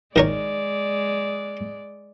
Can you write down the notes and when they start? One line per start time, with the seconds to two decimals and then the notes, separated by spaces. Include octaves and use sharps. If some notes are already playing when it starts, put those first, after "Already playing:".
0.16 D#3 G#3 A#4 C#5 D5